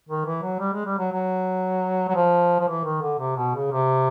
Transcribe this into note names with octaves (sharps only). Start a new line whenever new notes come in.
D#3
E3
F#3
G3
G#3
G3
F#3
F#3
F#3
F3
F3
E3
D#3
D3
C3
B2
C#3
C3